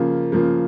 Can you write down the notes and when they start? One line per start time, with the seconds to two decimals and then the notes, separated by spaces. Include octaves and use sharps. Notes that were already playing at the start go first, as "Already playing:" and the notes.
Already playing: C#3 F3 A#3
0.32 C#3 F3 A#3